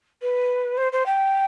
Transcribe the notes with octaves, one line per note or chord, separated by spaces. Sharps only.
B4
C5
C5
G5